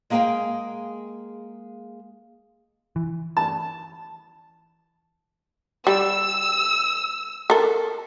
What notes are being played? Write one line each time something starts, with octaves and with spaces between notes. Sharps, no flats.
G#3 A#3 G#4 D#5 F5 G5
E3
A5
G3 E6
A4 A#4